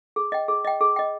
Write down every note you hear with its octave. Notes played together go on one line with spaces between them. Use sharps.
G#4
D#5 G5
G#4
D#5 G5
G#4
D#5 G5